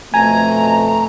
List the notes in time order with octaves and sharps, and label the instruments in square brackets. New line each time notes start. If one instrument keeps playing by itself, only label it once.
[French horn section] F2 B2 A3 [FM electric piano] G#5 [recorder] A#5